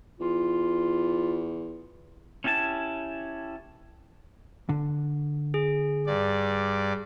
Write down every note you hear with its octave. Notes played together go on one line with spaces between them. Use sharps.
E2 F4
C#4 E4 G4 G#5 A5
D3
G#4
G2 D5